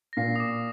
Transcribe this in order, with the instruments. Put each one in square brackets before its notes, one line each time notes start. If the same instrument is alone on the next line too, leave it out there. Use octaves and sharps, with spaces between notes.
[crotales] A#6
[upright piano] A#2 [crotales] C7
[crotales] D#6
D6